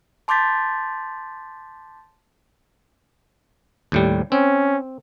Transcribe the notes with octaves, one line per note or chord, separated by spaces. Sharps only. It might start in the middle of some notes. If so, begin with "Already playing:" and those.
A5 C6 D6 G6 A6 B6
D#2 A2 G3
C4 C#4